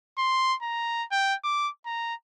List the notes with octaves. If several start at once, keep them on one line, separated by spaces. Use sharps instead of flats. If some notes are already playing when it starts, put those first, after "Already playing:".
C6
A#5
G5
D6
A#5